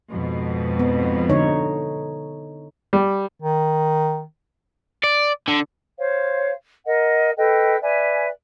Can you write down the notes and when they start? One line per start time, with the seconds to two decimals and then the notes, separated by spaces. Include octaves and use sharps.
0.10 F2 G#2 B2
0.79 B3
1.29 D3 D#4 C#5
2.93 G3
3.42 D#3
5.04 D5
5.48 D3
5.97 C5 C#5 F5
6.85 A#4 D#5 F#5
7.36 A4 B4 D#5 G5
7.81 B4 D5 E5 G#5